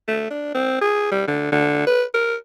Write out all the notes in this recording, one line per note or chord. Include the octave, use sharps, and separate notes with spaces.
A3
D4
C4
G#4
G3
D3
D3
B4
A#4